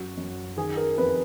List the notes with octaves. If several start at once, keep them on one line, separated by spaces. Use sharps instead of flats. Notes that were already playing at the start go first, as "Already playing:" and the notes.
Already playing: F#2 F#4
F#2
D#3 G#4
A#4
F2 B4